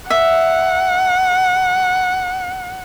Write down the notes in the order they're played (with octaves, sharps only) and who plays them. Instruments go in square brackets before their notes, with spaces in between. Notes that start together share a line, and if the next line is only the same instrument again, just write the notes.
[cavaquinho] E5 [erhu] F#5